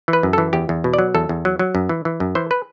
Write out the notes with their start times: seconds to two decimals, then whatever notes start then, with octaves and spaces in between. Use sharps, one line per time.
0.08 E3
0.13 B4
0.23 F#2
0.33 E3 A4
0.53 E2 G4
0.69 E2
0.84 B2
0.94 D5
0.99 F#3
1.14 E2 A4
1.29 E2
1.45 F#3
1.59 F#3
1.75 F#2
1.89 E3
2.05 E3
2.20 F#2
2.35 E3 C5
2.51 B4